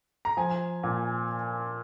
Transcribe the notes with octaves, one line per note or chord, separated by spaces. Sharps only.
A#5
F3 G#5
A#2